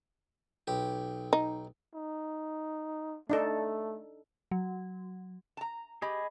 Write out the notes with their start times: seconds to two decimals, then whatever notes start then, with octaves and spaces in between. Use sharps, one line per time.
0.67 B1 G4
1.33 D#4
1.94 D#4
3.30 A3 D4 D#4 A4
4.51 F#3
5.57 A5 A#5
6.02 G4 G#4 D#5 B5